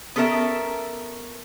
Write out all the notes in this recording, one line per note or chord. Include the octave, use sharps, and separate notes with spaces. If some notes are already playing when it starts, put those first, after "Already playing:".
B3 C#4 A4 A#4 E5